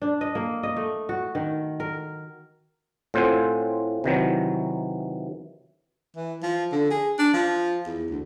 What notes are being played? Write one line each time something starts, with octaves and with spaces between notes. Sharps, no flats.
D4
D#5
A#3
D#5
A3
F#4
D#3
A#4
A2 C4 F4 C5 F#5 G#5
C3 D#3 E3 F#3
E3
F3
D3
G#4
D4
F3
E2
D2